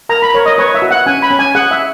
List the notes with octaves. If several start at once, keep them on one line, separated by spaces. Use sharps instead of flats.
A#4 A#5
B5
A#4 C#5
D#5
B4 C#5
E5
F#4
F#5
C#4 G#5
B5
C#4
G#5
G#4 F#5
E5